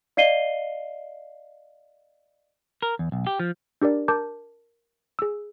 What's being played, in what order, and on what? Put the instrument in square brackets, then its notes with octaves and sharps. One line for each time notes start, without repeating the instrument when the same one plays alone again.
[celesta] D5 D#5 F5 C7 D#7 G7
[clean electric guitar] A#4
E2
B1
G4
F3
[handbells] D4 G4 A#4 D5
A#4 A5 D6 G6
G#4 E6